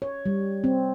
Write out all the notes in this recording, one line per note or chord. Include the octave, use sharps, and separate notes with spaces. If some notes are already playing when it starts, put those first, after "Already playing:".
C#5
G3
C4